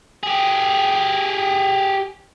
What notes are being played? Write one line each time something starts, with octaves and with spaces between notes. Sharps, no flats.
G4 G#4